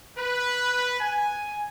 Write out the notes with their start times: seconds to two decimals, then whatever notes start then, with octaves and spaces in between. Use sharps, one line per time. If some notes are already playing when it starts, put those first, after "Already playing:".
0.18 B4
1.01 G#5